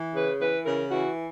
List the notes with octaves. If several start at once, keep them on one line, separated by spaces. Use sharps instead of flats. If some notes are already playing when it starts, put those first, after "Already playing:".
Already playing: E3
C#3 B4
E3 B4
C#3 A#4
E3 F#4